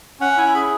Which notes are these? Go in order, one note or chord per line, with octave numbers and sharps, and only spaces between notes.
C#4 F#5
E4 G#5
G#4 B5